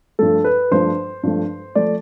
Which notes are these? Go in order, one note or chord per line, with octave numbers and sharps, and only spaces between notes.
G2 F3 A3 A4
B4
G2 F3 A3 C5
G2 F3 A3
F3 A3 D5